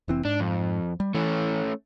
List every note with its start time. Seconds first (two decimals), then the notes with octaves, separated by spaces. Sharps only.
0.08 F1 E3 C4
0.25 G#2 D4
0.40 F2
1.00 G3
1.15 E3 A3 C#4